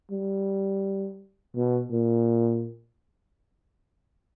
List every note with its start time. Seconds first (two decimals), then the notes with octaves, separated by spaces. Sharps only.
0.11 G3
1.56 B2
1.91 A#2